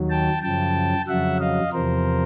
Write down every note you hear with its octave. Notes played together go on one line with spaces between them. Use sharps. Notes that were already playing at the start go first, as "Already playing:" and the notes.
Already playing: D#2 D#3 F#3
G5 A5
F#2 C#3 F3 G5 A5
F2 C#3 F#3 E5 F#5
D#5 F5
E2 C3 F3 A#4 C5